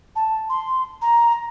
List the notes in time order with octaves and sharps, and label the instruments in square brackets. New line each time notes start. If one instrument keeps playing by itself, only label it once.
[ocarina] A5
C6
A#5